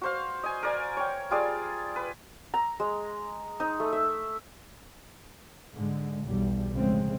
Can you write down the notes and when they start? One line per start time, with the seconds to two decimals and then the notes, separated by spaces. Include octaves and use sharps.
0.01 F#4 C5 F5
0.43 D#5 G#5
0.63 A#4 D5 G#5
0.97 C#5 G5
1.31 G3 F4 G#4 D5
1.96 B4
2.54 A#5
2.80 G#3
3.60 D#4
3.80 A3
3.93 E5
5.74 G#2 D3 G#3
6.25 B1 E2 G3
6.73 D2 A2 C#3 F3 G#3 C4